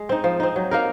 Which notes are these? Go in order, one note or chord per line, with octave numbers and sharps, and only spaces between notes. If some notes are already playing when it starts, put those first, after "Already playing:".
Already playing: G#3
C4 D#4
F3
C4 D#4
F#3
A#3 D#4 A#4